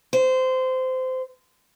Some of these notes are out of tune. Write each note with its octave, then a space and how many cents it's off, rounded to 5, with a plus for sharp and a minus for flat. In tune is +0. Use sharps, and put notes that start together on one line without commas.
C5 -20